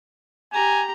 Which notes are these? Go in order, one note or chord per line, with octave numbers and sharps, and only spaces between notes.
G4 G#5 A#5